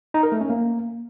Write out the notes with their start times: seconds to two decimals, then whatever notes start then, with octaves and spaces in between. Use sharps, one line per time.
0.14 D#4
0.23 A#4
0.32 A3
0.41 C#4
0.50 A#3